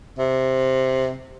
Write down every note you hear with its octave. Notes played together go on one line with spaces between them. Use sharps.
C3